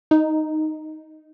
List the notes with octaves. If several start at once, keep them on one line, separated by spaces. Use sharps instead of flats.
D#4